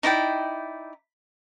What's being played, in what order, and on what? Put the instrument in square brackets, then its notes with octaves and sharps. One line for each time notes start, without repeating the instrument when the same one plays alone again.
[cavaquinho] D#4 E4 D5 G5